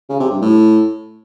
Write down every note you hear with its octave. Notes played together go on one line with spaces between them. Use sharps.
C#3
C3
G2
A2